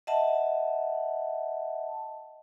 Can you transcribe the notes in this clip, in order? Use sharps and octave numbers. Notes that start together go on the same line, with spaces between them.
D#5 E5 F#5 A5